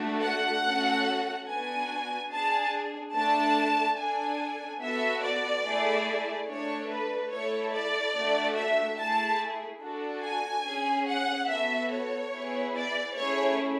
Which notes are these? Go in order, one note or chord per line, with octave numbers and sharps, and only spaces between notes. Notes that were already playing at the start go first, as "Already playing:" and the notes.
Already playing: A3 D4 F#4 A4
F#5
A3 C#4 F#4 A4
B3 D4 F#4 G#5
D4 G#4 A5
A3 D4 A4 A5
D4 A4 G#5
B3 F#4 A4 E5
D5
A3 E4 G#4
A3 D4 A4 C#5
B4
A3 E4 A4 C#5
D5
A3 D4 F#4
E5
A3 E4 G#4 A5
D4 F#4 A4
G#5
C#4 G#4
F#5
B3 F#4 A4 E5
C#5
B3 E4 G#4
D5
A3 C#4 E4 G#4 C#5